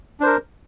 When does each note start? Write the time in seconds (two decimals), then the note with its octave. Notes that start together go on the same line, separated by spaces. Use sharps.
0.20 D4
0.23 C5
0.26 A#4